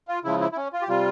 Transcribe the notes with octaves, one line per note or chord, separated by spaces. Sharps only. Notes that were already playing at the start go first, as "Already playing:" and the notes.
F4
C#3 F3 G#3 E4
E4
E4
C#4
F4
G4
C3 G3 F4